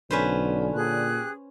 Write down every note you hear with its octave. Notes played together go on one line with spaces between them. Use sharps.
B1 D3 C#4 B4 C5
A#2 G4 G#4 F#6